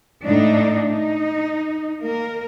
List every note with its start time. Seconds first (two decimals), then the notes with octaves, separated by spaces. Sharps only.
0.24 A2 A3 D4 D#4
0.90 D#4
2.01 A#3 A#4